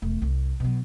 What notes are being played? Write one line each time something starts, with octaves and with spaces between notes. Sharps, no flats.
E1 A3
C2
B2 F#3